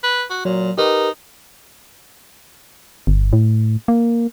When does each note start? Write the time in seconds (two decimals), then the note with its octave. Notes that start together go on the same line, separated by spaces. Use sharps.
0.03 B4
0.30 F#4
0.45 A#2 F#3
0.78 D#4 G4 A#4 B4
3.07 G1
3.33 A2
3.88 A#3